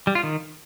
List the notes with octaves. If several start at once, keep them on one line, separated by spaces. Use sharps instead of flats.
G3
F4
D#3